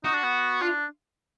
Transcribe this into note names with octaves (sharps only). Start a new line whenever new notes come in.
D#4 F#4
D4
B3
D4 F4